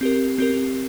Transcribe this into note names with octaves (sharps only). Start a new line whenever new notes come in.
C4 G4 A#4
C4 G4 A#4